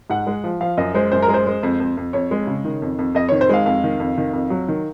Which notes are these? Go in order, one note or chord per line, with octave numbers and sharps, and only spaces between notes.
G#2 F#5
G#3
F3
F3 F5
F#2 D#5
G#3 C5
F#2 C5
A#4
G#3
C5
G#3
F2
F2
F2
F2 C#5
G#3
C#3
D#3
F2
F2
F2 D#5
D#3 C#5
C5
G#3 F5
F2 F5
D#3
F2
D#3
F2
F#3
D#3